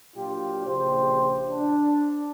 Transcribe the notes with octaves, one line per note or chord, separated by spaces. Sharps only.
A#2 F#3 D4 F4 G4
A#1 A#2 C#3 G4 C5
D4